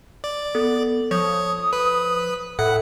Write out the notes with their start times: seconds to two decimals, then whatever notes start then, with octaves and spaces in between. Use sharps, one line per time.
0.24 D5
0.55 B3 A4
1.11 F3 C#5 D#6
1.73 B4
2.59 A2 A4 E5 F#5